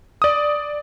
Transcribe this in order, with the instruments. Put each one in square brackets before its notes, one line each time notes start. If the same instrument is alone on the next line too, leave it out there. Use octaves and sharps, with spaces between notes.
[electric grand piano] D5 D#6